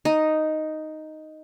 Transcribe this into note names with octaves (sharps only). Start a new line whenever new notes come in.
D#4